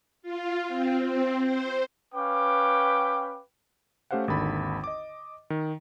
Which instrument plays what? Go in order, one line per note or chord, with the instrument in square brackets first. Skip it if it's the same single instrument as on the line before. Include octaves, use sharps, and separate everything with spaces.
[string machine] F4
C4
C4
C5
[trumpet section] C#4 B4 F5 G5 D6
[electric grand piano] A3 C#4 G4 C5 F5 F#5
G#1 D#2 D3 B5 A6
D#5 D6
D#3